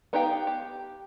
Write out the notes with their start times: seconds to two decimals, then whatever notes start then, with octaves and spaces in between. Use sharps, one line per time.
0.13 B3 D#4 G4 F5 G5
0.47 G4